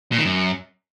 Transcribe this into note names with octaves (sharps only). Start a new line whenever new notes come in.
A#2
D#3
F#2